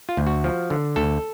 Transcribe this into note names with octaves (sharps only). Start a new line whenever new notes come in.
F4
D2
F#4
F3
D3
D2 A4